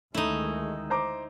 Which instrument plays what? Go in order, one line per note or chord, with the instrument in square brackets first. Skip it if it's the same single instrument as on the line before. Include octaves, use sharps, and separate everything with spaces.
[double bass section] D2 D#3 G#3 [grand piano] A3 [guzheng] D#4 E4
[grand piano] C5 A#5 D6